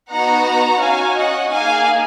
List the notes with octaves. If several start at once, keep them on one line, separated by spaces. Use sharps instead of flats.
B3 D#4 F#4 F#5 A#5
C#4 F#4 F5 G#5
D#5 F#5
A#3 D#4 G#4 F5 G#5